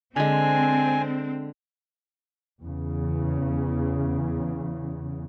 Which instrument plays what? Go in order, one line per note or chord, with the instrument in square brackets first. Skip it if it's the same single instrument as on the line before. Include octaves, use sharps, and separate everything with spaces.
[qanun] D3 G#3 [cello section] C4 [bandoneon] G#5
[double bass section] E2 C#3